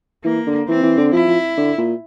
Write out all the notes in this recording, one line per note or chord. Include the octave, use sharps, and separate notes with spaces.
E3 A#3
D3
E3 C4
E3
D3
F3 E4
F3
D3
A#2